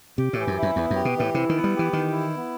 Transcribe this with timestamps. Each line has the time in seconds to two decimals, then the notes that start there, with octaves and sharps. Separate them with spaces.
0.18 C3 G4
0.33 A2 E3
0.47 F#2
0.57 E4
0.62 F#2
0.76 E2 B3
0.90 F#2
0.96 G4
1.05 B2
1.16 A2 E3
1.34 C3 E4
1.49 D#3
1.54 B3
1.64 G3
1.73 G4
1.79 E3
1.93 D#3 E3
2.13 E4
2.32 B3